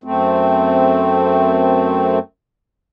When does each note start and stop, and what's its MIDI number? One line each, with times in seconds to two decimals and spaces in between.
0.04 2.19 42
0.04 2.19 57
0.04 2.19 60